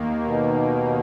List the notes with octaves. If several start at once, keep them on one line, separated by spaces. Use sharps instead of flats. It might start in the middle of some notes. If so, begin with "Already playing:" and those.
Already playing: D#2 D#3 A#3
B2